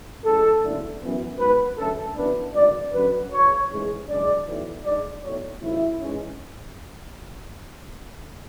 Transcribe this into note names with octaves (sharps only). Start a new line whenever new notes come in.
A1 A2 G#3 C#4 A4
F#1 E2 D3 A3 D4
F#2 E3 B3
G#2 F#3 B3 B4
F#2 D3 A3 C#4 A4
F#1 F#2 E3 B3 D4 B4
G#1 F#2 D3 A3 D5
F#2 D3 F#3 C#4 B4
F#1 F#2 C#3 C#5
A1 G#2 E3 G#3
F#1 F#2 C#3 G#3 D4 D5
B1 A2 E3
G#2 G#3 D4 D5
B1 A2 F#3 C#5
G#1 F#2 C#3 E4
G#2 E3 G#3 C#4